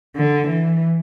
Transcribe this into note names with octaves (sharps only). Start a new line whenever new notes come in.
D3
E3